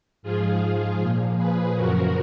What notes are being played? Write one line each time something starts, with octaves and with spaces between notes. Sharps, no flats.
G#2 F3 F4 G#4
A#2 F3
G#4 B4
F#2 C#3 F3 F#4 A#4